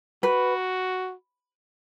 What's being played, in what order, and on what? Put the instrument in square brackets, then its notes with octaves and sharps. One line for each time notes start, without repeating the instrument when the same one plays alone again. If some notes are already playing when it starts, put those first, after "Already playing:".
[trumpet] F#4 [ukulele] B4